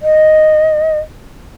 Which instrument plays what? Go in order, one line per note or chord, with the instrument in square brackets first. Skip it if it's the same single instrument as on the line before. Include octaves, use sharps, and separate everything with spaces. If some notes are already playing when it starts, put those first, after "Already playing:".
[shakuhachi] D#5